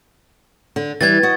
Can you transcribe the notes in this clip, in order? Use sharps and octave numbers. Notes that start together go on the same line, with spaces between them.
D3
E3 G3 G#6 A6
F#4 D#5